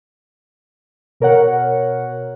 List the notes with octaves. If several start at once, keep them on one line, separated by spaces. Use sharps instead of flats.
B2 A#4 C#5 F#5